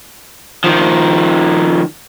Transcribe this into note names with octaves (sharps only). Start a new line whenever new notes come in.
D#3 F3